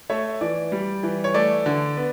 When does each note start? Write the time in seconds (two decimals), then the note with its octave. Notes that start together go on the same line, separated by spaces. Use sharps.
0.09 A3 C#5 E5
0.41 E3 D5
0.72 G3
1.03 E3
1.24 C#5
1.34 A3 D5
1.66 D3
1.97 B3